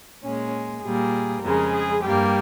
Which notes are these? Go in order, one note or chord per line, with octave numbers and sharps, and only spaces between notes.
A#2 G#3 C#4
A#2 G3 A#3 G#4
F2 C#3 G#3 A#4
G#4
G2 G3 A#3 G4